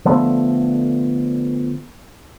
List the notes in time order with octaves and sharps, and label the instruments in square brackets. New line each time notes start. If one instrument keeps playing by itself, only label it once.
[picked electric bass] D3 F3 A3 B3